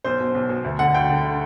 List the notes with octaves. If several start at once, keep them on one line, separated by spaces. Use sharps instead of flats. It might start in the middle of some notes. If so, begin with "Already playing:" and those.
B1 C5
B2
B1
B2
D2
D3 F#5
D2 G5
D3